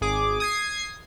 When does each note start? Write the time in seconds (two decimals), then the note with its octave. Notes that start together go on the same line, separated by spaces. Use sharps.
0.01 G#1 G#4 D6
0.40 D#6 G#6 C7